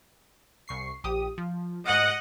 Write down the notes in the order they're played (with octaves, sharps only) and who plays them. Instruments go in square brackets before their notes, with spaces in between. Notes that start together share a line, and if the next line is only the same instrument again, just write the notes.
[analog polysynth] C2 C#6 C7
A#1 G4 D#6
F3
[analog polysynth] G#2 D7 [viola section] D#5 F#5